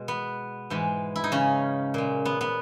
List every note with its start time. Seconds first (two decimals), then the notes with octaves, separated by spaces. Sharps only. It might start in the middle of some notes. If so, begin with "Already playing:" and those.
Already playing: B2 G#3
0.08 B3
0.70 G#2 E3 G#3
1.16 E4
1.24 D#4
1.32 C#3 C#4
1.94 A#2 G#3
2.25 B3
2.41 B3